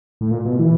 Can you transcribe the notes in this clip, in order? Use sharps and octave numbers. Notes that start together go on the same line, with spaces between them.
A2
A#2
B2
E3